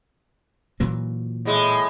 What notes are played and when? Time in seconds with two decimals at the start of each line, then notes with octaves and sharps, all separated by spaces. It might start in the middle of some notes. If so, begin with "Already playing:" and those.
0.80 A#2 E3 F#3
1.45 A2 G#3